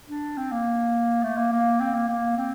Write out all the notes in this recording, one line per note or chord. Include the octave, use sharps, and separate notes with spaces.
D4
C4
A#3
A3
A#3
A#3
C4
A#3
A#3
C4